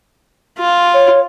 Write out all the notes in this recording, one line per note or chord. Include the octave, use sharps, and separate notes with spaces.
F4
C#5